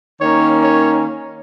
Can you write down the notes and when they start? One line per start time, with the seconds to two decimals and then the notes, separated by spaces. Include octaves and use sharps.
0.21 D#3 A#3 C#4 C#5
0.64 C#5